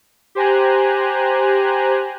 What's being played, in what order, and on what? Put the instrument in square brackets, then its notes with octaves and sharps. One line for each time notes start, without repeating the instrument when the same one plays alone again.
[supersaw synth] G4 C5 G#5 A#5 F#6